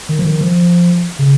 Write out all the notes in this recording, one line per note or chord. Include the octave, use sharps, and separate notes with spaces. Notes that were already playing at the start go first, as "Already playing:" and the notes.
D#3
F3
D#3
F3
C#3